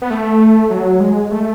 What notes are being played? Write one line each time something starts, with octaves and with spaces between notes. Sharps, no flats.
B3
A3
F#3
G#3
A3